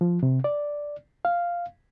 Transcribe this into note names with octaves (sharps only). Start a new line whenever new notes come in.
F3
C3
D5
F5